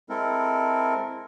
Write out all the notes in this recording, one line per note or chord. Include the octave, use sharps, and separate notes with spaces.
G#3 C4 E4 A4 A#4